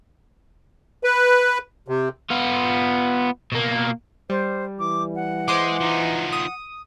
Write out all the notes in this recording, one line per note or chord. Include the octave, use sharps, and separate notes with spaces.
B4
C3
B3 F4
B2 A#3
G3 C5
E3 D6
F#5
G#3 C5 C6 D6
F3 D#4
D#6